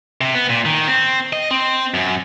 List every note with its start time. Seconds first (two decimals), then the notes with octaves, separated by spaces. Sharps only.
0.21 C3
0.34 B3
0.49 A#2
0.65 D#3
0.88 C4
1.33 D#5
1.51 C4
1.94 F#2